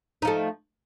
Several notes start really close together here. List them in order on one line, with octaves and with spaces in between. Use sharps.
D#4 F3 A3